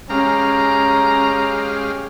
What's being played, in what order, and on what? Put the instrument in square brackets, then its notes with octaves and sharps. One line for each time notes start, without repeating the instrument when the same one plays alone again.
[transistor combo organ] G#3 G4 F5 [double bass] C#4 [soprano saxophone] A#5